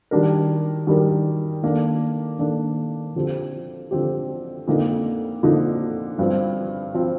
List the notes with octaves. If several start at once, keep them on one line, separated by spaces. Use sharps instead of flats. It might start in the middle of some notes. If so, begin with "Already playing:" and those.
D#3 G3 D4 G4 A#4
D#3 G3 D4 G4 A#4
D#3 A#3 D4 A4
D#3 A#3 D4 A4
D3 F3 C4 G4
D3 F3 C4 G4
F2 D3 F3 A#3 D#4
F2 D3 F3 A#3 D#4
G2 F3 C4
F3 C4